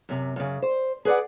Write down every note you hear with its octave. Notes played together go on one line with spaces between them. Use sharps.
F#2 C3
F#2 C#3
C5
G#4 B4 C5 D5 F#5